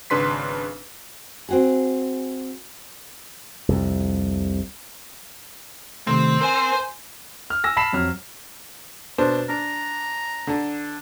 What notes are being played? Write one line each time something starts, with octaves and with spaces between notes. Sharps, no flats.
G#1 C#3 D4 B4 C6 B6
C4 F#4 G#4
C2 F2
C3 D#3 A3 C4
A#4 C5 G#5
F6
G#5 E6 A#6
A5 B5 B6 C7 E7
F2 F#3 F6
B2 D4 C5
D4 A#5
D3 D4